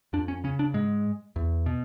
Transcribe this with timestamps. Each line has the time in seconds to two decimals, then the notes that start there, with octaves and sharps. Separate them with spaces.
0.13 F2 D4
0.28 C#4
0.44 C#3 C#4
0.59 D4
0.74 G#2 G#3
1.36 E2
1.66 B2